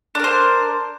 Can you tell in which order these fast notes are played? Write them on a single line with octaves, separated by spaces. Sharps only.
D4 A#4 C5